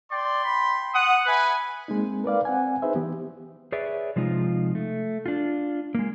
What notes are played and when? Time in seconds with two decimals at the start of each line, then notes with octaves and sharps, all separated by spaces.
0.11 D5 G5 C6
0.44 B5
0.95 F#5 D#6
1.26 B4 E5 G#5
1.88 G#3 A#3 C4 D#4
2.24 A#4 B4 D5 F5
2.45 C4 F#5 G#5
2.82 D#4 G#4 B4 C5 E5
2.95 E3 B3 G4
3.72 G#4 B4 C#5 D5 E5
4.16 C3 F3 G#3 D#4 F4
4.75 A3
5.26 D4 F4
5.95 G#3 A#3